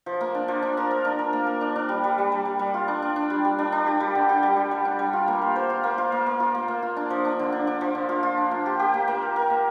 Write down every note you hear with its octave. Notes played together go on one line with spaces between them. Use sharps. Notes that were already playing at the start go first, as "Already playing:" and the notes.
F3
A#3
D4
F3
D4
A#4
A#4
D4
A#4
A#3
A#4
D4
D4
G3
G3
G3
G3
G3
G3
F4
D4
D4
D4
G3
G3
D4
D4
G4
G3
D3
G4
G3
G4
G3
D4
G3
F4
A#3
F4
C5
F4
A#3
F4
A#3
A#3
F4
A#3
A#3
F4
D4
F3
D4
D3
D4
D4
F3
D3
F4
F4
D4
A#3
G4
G4
A#3
A#3
A#4
A#4
A#3